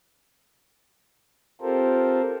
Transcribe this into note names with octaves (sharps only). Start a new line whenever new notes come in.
C4 F4 G4 A4 A#4 C5